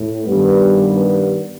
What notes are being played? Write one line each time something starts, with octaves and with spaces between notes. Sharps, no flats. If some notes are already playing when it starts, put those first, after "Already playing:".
Already playing: A2
G2 D#3 G3 B3